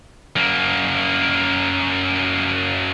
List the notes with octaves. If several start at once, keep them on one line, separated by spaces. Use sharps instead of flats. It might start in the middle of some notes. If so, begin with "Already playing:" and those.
F#2 A#3